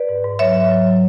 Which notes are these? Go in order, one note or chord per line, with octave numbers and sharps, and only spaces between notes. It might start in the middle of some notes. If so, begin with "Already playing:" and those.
Already playing: B4 D5
G#2
G#2
F#3 C#5 E5
G#2
F#3
F#3